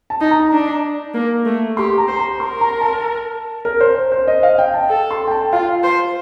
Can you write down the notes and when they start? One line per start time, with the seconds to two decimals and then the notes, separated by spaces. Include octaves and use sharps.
0.10 A5
0.21 D#4
0.31 A#5
0.52 D4
1.14 A#3
1.45 A3
1.77 G4 C6
1.98 A#5
2.08 C5
2.19 A#5
2.40 A#4 C6
2.61 A#5
2.81 A5
3.65 A#4
3.81 C5
4.12 C5
4.28 D#5
4.43 F5
4.58 G5
4.74 A5
4.89 A4
5.11 C6
5.27 G5
5.31 A5
5.53 F4 F5
5.83 C5